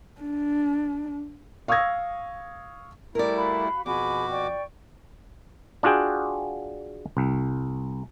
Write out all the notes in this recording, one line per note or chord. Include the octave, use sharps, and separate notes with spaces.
D4
F5 C#6 D#6 E6 G#6 A#6
G3 A3 E4 A#4 D5
F#4 F5 B5
F2 B2 F#4 G#4 G#5 B5 D6
D5 G5 C#6
D4 F4 F#4 G#4 G5
C2